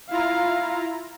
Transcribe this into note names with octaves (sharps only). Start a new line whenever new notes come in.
E4 F4 F5 A#5